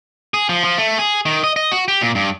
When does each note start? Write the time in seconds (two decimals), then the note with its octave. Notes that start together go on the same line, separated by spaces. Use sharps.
0.34 G#4
0.49 F3
0.64 F3
0.78 A3
0.99 G#4
1.26 D#3
1.44 D#5
1.56 D#5
1.72 F#4
1.88 G4
2.01 A#2
2.15 G2